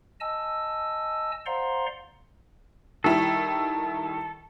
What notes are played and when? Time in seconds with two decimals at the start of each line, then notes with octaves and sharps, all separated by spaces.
0.20 D#5 G#5 A5 E6
1.46 C5 D5 F5 F#5 A#5 C6
3.04 D#3 G3 E4 A4